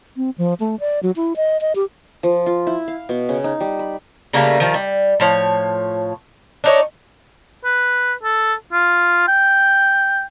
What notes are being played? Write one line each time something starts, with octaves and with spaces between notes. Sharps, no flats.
C4
F3
A3
D5
F#3
E4
D#5
D#5
G4
F3
F4
E4
F5
B2
C#3
D#4
G3
B5
C#3 G3 A3 A#3
D#3 F3
G3
A2 F3 C#5
D4 D#4 C#5
B4
A4
F4
G5